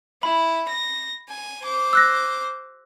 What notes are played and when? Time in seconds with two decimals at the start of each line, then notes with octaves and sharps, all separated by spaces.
0.23 E4 B5
0.69 A#6
1.29 G#5
1.63 C5 D6
1.93 E6 F#6 A#6